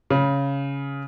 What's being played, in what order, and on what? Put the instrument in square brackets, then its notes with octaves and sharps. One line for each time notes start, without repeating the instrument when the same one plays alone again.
[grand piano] C#3